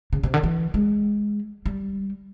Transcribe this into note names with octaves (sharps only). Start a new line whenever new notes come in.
C#3
C3
D3
E3
G#3
G3